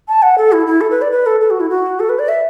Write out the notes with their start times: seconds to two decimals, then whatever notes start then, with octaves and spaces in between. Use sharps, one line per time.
0.08 A5
0.23 F#5
0.38 A4
0.52 E4
0.67 E4
0.81 A4
0.91 B4
1.02 D5
1.11 B4
1.26 A4
1.41 A4
1.50 F#4
1.60 E4
1.70 F#4
2.00 A4
2.09 B4
2.19 D5
2.29 E5